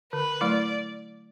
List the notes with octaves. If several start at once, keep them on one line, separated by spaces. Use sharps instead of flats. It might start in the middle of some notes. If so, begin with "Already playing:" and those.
D3 B4
F#3 A3 E4 D5